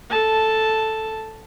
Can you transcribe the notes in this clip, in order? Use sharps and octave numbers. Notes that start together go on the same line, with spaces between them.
A4 A5